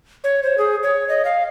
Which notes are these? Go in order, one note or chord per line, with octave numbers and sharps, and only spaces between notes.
C#5
C5
G#4
C#5
D#5
F5